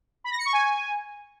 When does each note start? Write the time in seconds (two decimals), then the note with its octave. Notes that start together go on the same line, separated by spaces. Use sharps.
0.24 B5
0.31 A#6
0.39 C#7
0.46 C#6
0.53 G#5